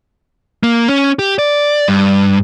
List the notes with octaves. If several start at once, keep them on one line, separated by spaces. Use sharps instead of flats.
A#3
C#4
G4
D5
G2